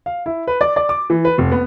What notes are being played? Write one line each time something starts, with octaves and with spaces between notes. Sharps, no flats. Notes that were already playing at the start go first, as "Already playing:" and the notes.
F5
E4
B4
D5
D5
D6
E3
B4
F1
B3